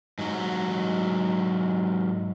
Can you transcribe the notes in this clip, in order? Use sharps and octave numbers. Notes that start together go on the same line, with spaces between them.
G#2 F#3